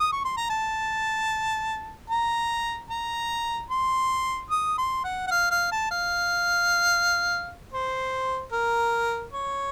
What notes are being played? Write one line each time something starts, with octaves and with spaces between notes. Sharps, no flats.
D#6
C#6
C6
A#5
A5
A#5
A#5
C6
D#6
C6
F#5
F#5
F5
F5
A5
F5
C5
A#4
C#5